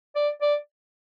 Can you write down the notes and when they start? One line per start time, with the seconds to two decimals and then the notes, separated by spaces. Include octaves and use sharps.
0.15 D5
0.42 D5